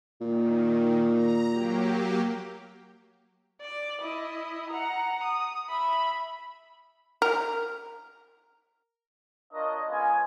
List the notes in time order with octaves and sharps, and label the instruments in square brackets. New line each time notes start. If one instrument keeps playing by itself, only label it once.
[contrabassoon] A#2 [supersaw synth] D#3
[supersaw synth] A#5
F#3 A#3 G4
[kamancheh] D5 D6
E4 D#5
F#5 A#5
D#6
E5 B5
[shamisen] A#4
[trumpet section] D4 F4 A#4 C#5 D#5
G#3 B3 C#4 F4 F5 G#5